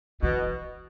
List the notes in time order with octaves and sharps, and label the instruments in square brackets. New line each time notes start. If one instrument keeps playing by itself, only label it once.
[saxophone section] B2 [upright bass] E3